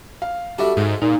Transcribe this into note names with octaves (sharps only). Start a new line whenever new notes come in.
F5
G3 D4 F#4 A4 E5
G#2 G#3
A#2 D#4